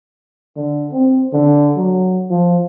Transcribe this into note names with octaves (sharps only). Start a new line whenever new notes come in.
D3
C4
D3
F#3
F3